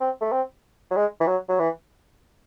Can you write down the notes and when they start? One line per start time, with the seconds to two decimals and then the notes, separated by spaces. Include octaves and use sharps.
0.01 C4
0.21 A3
0.32 C4
0.91 F#3
0.96 G#3
1.20 E3
1.27 F#3
1.49 F#3
1.59 E3